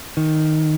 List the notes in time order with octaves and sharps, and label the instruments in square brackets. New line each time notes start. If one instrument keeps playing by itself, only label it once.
[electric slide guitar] D#3